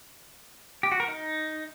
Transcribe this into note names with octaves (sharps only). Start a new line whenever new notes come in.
G4
F#4
A#4
D#4